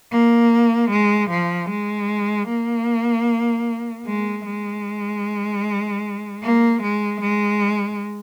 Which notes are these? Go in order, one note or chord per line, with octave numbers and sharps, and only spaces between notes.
A#3
G#3
F3
G#3
A#3
G#3
G#3
A#3
G#3
G#3